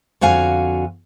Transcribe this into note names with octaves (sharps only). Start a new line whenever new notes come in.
F2 D3 F#4 F5 G#5